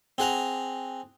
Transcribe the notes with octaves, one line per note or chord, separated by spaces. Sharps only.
C4 G#4 F#5 A#5